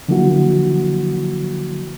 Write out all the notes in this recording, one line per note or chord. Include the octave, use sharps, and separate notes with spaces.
D3 F3 F#3 A#3 E4 F#4